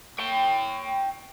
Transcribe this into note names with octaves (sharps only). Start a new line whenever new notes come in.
C#5 G5